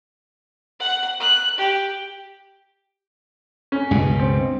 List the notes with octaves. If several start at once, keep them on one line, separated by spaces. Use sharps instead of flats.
F#5
F#6
G4
C#4
C#2 G2 B2
C4